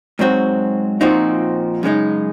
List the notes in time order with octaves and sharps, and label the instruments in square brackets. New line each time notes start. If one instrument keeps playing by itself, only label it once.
[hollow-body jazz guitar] G#2 F#3 C4 F#4
A#2 F3 C4 D#4 F#4
F#2 C#3 G#3 D#4